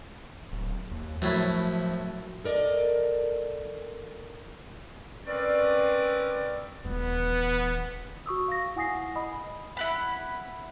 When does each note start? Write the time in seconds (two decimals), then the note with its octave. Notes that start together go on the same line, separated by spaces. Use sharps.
0.52 D1
0.92 D#2
1.22 F#2 A2 F3 B5
2.44 A4 A#4 D5 D#5
5.26 C4 C#4 A#4 B4 D5
6.85 D#1 E3 B3
8.26 F#4 C#6 D#6 E6
8.48 F5 C#6 A#6
8.76 E4 F#5 G#5 D#6 A#6 C7
9.16 D#5 B5 D#6
9.77 E4 F#5 B5